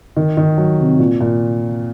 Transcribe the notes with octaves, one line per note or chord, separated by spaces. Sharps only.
D#3
D#3
F#3
C3
A#2
A#2